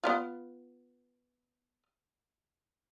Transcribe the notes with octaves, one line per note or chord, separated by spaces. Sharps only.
B3 E4 F4